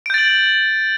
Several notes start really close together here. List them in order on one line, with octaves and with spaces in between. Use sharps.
D7 G6 A6 F#7